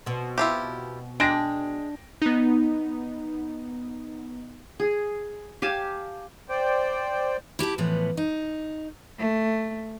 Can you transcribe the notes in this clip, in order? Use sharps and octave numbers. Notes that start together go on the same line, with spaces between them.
B2 C4
E4 F4 G4
G#3 D4 G5 A#6 D7
B3 D#4
G#4
G4 F5 G#5 A5
C5 D5 G5
E4 G4 G#5 A5
A2 E3 F3 B3
D#4
A3